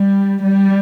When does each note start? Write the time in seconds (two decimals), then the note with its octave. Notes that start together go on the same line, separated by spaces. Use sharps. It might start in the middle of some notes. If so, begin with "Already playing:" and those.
Already playing: G3
0.43 G3